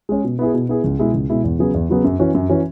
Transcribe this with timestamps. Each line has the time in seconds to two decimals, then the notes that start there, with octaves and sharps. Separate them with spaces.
0.09 G#3 C#4
0.24 B2
0.39 B3 E4 G#4
0.54 B2
0.69 B3 E4 G#4
0.84 C#2
0.99 B2 G#3 E4
1.14 C#2
1.30 B2 G#3 E4
1.44 E2
1.59 C#3 F#3 B3 G#4
1.74 E2
1.89 C#3 F#3 B3 G#4
2.04 F#2
2.20 E3 C#4 F#4
2.35 F#2
2.49 E3 C#4 F#4